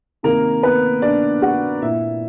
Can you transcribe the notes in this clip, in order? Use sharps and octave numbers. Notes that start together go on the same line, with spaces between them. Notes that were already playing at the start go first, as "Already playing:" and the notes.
C3 D#3 A#3 A#4
B3 B4
D4 D5
F#4 F#5
A#2 E4 E5